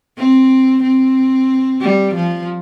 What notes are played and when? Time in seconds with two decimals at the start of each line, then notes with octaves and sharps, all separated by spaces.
0.18 C4
0.83 C4
1.81 G3
2.14 F3